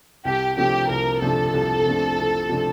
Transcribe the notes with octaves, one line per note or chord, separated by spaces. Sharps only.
C2 G4
C3 F3 A3 D4 G4
C2 A#4
C3 F3 A3 D4 A4
C2
C3 F3 A3 D4
C2
C3 F3 A3 D4